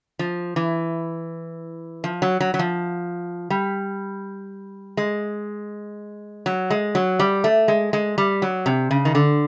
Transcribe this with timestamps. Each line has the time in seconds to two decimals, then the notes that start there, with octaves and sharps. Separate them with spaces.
0.19 F3
0.56 E3
2.04 F3
2.22 F#3
2.41 F#3
2.54 F#3
2.59 F3
3.50 G3
4.97 G#3
6.46 F#3
6.70 G#3
6.95 F#3
7.19 G3
7.44 A3
7.68 G#3
7.93 G#3
8.18 G3
8.42 F#3
8.66 C3
8.91 C#3
9.05 D#3
9.15 D3